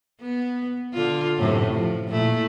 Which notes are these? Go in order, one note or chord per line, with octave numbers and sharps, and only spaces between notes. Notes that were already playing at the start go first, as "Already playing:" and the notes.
B3
D3 F4
F#2 A2 C3
F3
A#2 A3 E4